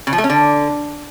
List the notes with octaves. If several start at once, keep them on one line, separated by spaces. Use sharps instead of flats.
C#3
F3
A3
C#4
D3